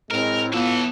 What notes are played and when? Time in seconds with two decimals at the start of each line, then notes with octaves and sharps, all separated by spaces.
0.11 A2 G#3 C4 A#4
0.53 E3 B3 F4 A4